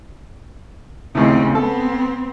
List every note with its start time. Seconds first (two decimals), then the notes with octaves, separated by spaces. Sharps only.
1.15 D#2 A2 C#3 C4
1.55 B3 C4 A4